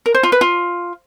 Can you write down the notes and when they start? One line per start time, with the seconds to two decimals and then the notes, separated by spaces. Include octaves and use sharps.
0.06 A#4
0.15 C5
0.23 F4
0.32 B4
0.41 F4